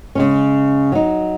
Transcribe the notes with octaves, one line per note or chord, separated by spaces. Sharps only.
C#3 G#3 C#4
F#3 D#4